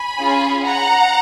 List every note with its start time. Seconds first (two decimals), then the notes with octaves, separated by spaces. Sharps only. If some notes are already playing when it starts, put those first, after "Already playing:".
Already playing: G#5 B5
0.19 C#4 F4 G#4
0.65 F#5 A#5